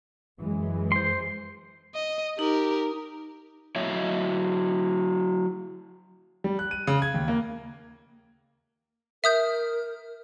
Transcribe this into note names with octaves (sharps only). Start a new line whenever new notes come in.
F#2 E3 G#3
C5 C6
D#5
D#4 G4 A#4
F#3 E4 C#5 E5
G3
F#6
D#7
C#3
G#6
D#2
A#3
A#4 E5 D#6 G6